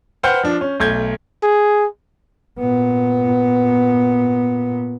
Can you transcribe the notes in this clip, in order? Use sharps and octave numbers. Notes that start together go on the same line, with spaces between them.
B4 C5 F#5 G5 F6 G6
F3 D4
C#4
B1 A3 G6 G#6
G#4
A#2 B3